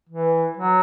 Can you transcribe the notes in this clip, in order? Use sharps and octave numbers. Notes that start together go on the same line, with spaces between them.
E3
F#3